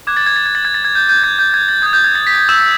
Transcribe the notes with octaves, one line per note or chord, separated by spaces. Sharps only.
D6 F#6 G#6
A6
G#6
A6
G#6
A6
G#6
A6
G#6
G6
G6
G#6
G6
G#6
A6
D#6 G6 G#6
G6
G#6
A6
B6
E6 E7